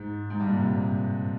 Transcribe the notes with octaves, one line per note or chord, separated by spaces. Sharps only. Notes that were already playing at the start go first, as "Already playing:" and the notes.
Already playing: G#2
G#2
G2
A#2
C3